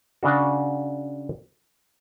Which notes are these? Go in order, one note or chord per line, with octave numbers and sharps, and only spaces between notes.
C#3 D4 F#4